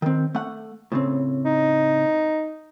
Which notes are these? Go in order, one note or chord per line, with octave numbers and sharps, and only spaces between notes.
D#3 C4
A3 F#5
A2 C#3 C4
D#4